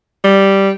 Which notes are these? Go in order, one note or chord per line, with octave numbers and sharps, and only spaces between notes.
G3